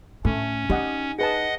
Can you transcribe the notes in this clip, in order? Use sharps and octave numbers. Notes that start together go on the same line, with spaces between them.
A2 A3 C#4
D#4 G4 D#5 F#5
G#4 B4 D#5 F#5 A5